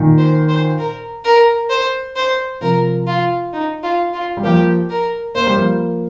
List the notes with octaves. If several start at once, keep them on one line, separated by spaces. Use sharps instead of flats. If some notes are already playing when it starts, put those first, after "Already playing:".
Already playing: A#2 D#3
C5
C5
A#4
A#4
C5
C5
C3 F3 A#4
F4
D#4
F4
F4
G3
F3 A#3 G4
A#4
A#3 C5
G3
F3 A#3